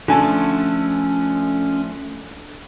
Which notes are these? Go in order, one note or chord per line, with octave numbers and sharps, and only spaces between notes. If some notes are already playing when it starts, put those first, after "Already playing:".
D3 F3 A3 C#4 G#5 A5